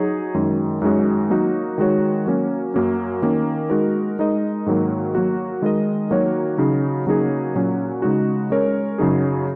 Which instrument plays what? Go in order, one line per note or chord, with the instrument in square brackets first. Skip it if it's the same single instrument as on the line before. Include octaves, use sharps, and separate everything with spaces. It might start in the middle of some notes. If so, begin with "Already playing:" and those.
Already playing: [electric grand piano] F#3 D#4 G#4 C#5
F#2 D#3 G#3
F#2 D#3 G#3 C#4 F#4
F#3 A#3 D#4 F#4 A#4
D#3 G#3 F#4 C#5
F#3 A#3 C#4
F#2 F#3 A#3 C#4
D#3 A#3 C#4
G#3 D#4 F#4 A#4
G#3 D#4 A#4 D#5
G#2 D#3 F#3 A#3
F#3 A#3 F#4
D#3 G#3 D#4 A#4 D#5
D#3 F#3 A#3 F#4 C#5
C#3 F#3 D#4
C#3 F#3 A#3 D#4 G#4
A#2 F#3 C#4
C#3 G#3 D#4 F#4
G#3 C#4 A#4 C#5
F#2 C#3 F#3 D#4 G#4